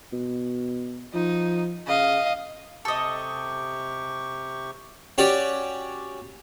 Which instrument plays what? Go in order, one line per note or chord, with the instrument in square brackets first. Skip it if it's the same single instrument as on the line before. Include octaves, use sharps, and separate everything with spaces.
[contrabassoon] B2
[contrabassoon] F3 [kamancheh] D#4
[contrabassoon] C#3 [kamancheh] D#5 F5
[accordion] C3 G4 C#6 [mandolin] A4 D#5
[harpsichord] C#4 F#4 G4 C#5 D5